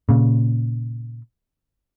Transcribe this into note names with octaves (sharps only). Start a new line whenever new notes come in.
A#2 C#3